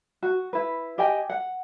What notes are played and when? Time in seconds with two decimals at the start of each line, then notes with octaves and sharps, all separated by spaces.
0.23 F#4
0.53 E4 B4
0.98 G4 D#5 G5 G#5
1.30 F#5